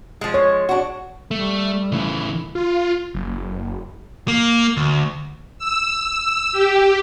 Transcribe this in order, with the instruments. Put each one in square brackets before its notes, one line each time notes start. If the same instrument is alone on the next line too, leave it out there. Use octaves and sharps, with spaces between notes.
[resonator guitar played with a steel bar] F3 G#3
[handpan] C#5
[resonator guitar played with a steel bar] D4 F#4
[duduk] G3 [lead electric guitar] A3
[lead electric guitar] C#3 E3 [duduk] A3
[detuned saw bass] F4
F#1
[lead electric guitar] A#3
D2
[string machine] E6
E6
G4